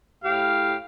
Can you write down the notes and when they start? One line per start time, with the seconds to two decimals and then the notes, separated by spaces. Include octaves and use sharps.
0.24 A2 G4 F5